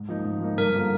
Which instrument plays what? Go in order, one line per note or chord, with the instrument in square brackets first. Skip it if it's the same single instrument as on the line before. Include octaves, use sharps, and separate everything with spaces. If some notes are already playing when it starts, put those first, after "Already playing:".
Already playing: [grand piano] G#2
F3 A#3 D#4
G#2
F3 A#3 D#4
[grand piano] G2 [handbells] A#4
[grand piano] D3 F3 A#3